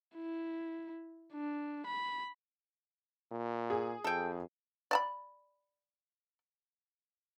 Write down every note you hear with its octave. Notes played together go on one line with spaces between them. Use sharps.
E4
D4
B5
A#2
G#4
F2 A4 G5
D5 A5 B5